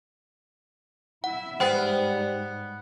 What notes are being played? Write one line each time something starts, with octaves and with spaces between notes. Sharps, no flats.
E4 E5 F#5
G#2 G3 B3 C5 G5